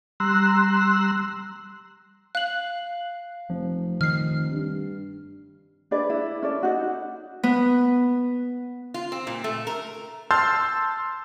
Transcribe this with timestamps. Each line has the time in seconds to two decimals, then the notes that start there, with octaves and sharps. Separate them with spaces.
0.20 G3 A#5 C6 E6 F#6
2.35 F5 F#6 F#7
3.50 F1 F3
4.01 D#3 F6 C7
4.51 G2
5.91 D4 G#4 B4 D5
6.10 E4
6.42 C#4 A4 D5
6.63 D#4 F#4
7.43 B3
8.94 F4
9.12 C4
9.27 A#2
9.44 A3
9.67 A#4
10.31 A5 C6 E6 F6 G6 A6